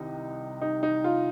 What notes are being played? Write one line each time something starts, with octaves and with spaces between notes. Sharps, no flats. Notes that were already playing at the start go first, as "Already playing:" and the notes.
Already playing: C2 C3 D#3 D#4
D#4
D#4
F4